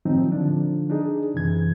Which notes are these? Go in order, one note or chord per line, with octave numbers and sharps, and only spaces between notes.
A2 D#3 F3 F#3 C4 D#4
D3 F3 D4
D4 D#4 G#4
F#2 C3 E3 G#6